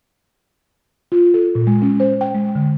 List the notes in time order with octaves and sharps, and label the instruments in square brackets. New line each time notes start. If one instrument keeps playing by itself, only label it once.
[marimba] F4
A4
A#2
G#3
C#4
C5
G5
G#3
D3